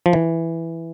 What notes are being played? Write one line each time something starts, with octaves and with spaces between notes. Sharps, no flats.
F3
E3